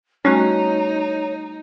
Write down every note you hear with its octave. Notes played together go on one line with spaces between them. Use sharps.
G3 A3 C#4 D#4 F#4 C#5